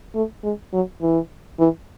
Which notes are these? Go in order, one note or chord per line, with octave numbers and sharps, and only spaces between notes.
A3
G#3
F#3
E3
E3